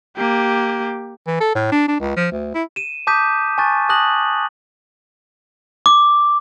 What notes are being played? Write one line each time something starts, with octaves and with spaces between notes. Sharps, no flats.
A#3 G4
E3
A4
A2
D4
D4
C#2
F3
D2
E4
D#7 E7
A5 D6 D#6 G6 B6 D#7
G#5 A5 C#6 F#6 A6
A5 D#6 F#6 A#6 F#7
D6